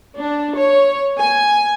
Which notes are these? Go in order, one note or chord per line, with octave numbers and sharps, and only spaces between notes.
D4
C#5
G#5